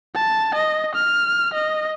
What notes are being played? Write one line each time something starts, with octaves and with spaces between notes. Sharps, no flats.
A5
D#5
F6
D#5